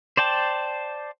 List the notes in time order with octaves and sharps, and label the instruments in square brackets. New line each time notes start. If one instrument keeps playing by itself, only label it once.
[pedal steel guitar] C5 D5 G5 A5